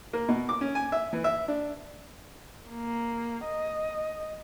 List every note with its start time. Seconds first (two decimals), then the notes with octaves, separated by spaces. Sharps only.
0.13 A#3
0.28 B2
0.49 D6
0.61 C#4
0.75 G#5
0.92 E5
1.13 E3
1.24 E5
1.48 D4
2.70 A#3
3.45 D#5